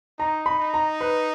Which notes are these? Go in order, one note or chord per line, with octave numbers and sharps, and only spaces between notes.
D#4 A#5
B5
D#4
A#5
B4